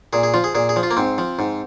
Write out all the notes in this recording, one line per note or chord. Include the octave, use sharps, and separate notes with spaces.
A#2 G#4
G#4
F3 F4
G#4
A#2 G#4
G#4
F3
F4
A#3
G#2 C4
F3
G#2